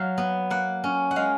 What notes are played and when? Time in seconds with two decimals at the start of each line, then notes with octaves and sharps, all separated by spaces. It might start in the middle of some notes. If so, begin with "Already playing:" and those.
Already playing: F#3 F5
0.18 B3
0.50 A#3 F#5
0.84 C#4
1.11 F#5
1.16 G#3 F5